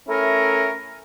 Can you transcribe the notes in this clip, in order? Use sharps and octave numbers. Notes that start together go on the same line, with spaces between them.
A3 C#4 E4 A#4